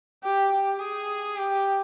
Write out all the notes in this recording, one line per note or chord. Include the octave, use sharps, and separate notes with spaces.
G4
G4
G#4
G4